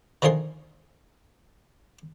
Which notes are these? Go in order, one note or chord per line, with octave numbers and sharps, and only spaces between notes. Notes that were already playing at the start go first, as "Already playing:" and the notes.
D3 D#3 F3 G#4 C6